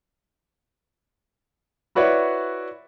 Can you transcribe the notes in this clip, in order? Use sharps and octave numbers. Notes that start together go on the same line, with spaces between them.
E4 F#4 B4 C#5 D5 E5